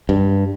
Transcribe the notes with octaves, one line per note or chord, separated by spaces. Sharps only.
G2